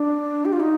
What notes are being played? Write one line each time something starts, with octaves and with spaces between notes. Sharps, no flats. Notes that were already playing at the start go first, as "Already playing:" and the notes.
Already playing: D4
G4
F4
D#4